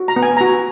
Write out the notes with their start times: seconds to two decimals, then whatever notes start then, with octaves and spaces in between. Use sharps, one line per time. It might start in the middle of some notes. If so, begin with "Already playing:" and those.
Already playing: F#4
0.08 A#5
0.16 B3
0.23 G#5
0.37 F#4 A#5